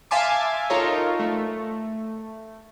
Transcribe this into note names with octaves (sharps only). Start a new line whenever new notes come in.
E5 F5 G#5 A5 C6 D6
D#4 F4 A4 A#4 C#5
A3